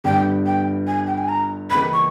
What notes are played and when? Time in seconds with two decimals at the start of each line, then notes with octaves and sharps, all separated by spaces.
0.04 G1 G2 G3 B3 G5
0.46 G5
0.87 G#5
1.07 G5
1.18 G#5
1.28 A#5
1.70 C#2 C#3 E3 A#3 B5
1.93 C#6